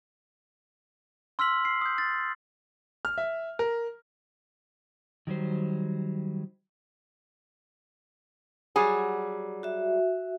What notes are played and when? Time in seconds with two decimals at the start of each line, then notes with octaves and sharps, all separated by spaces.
1.39 C6 E6 F6 B6 F#7
1.65 C7
1.81 D#6 G6
1.98 A6
3.05 F6
3.18 E5
3.59 A#4
5.27 D#3 F#3 G3 C5
8.76 F#3 G3 G#4
9.63 F#4 E5